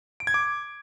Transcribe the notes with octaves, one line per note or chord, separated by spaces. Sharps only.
D7
G#6
D6